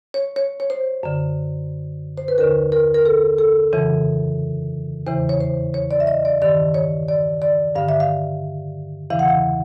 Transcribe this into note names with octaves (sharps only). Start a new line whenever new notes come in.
C#5
C#5
C#5
C5
F#2 D3
C5
B4
D#2 D3 A#4
A#4
A#4
A4
A4
F2 C#3 E3
E2 C#3 E3 C5
C#5
C5
C#5
D5
E5
D#5
D5
G2 D#3 D5
C#5
D5
D5
G2 D3 F5
E5
F5
E2 C#3 E3 F5
F#5
F5